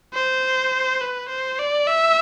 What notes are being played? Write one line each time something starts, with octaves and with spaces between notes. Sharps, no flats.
C5
B4
C5
D5
E5